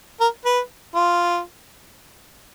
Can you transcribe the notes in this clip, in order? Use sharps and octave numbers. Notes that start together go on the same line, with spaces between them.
A#4
B4
F4